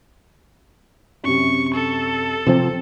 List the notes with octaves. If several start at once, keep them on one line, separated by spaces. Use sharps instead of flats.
F#2 C3 C#6
A4
C3 F3 C4